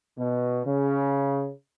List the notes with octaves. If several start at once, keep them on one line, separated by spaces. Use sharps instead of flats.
B2
C#3